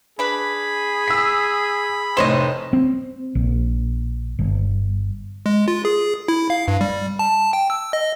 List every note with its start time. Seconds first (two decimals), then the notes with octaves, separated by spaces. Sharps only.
0.19 D4 G#4 B4 B5
1.08 E6 B6
2.17 F1 A2 C5 C#5 D#5 E7
2.73 C4
3.35 A#1
4.39 G1
5.46 G#3
5.68 F4
5.85 G#4
6.28 E4
6.50 F5
6.68 G2
6.81 G3
7.19 A5
7.53 G5
7.70 E6
7.93 D#5